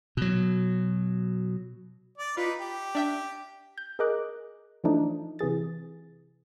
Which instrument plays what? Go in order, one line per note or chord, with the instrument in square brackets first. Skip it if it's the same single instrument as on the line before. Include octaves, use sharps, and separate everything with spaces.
[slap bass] B2 F#3
[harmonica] D5
[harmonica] D#4 B4 [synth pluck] F4
[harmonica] G4
[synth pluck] D4 E5 G5
G6
G#4 A#4 D#5 D6 F#6
E3 F3 A3 D4 D#4
C3 E3 G#4 A6